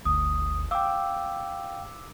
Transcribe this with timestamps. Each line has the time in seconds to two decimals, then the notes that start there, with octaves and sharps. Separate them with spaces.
0.05 G1 D2 D#6
0.71 F5 G5 D6 E6